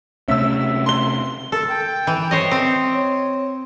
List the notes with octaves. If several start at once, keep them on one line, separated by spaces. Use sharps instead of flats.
C3 A3 C#4 E5 E6
C6 G7
A4 A#4
G5
E3
C5 C#5 D#5
C4
C#5